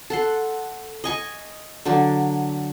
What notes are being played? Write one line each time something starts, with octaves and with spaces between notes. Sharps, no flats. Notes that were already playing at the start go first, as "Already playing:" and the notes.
A4 F#5 C6
D#5 G#5 C#6
D3 F#3 D4